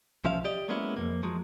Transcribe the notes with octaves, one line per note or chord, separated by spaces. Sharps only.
B1 F3 C#4 E5 F5
G4 D5 D#5
F#3 G#3 A#3 B3 C#4 E4
F2 G#2 A#3
F3 F#3 G#3